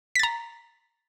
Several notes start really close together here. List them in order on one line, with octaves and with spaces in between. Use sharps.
B6 A6 A#5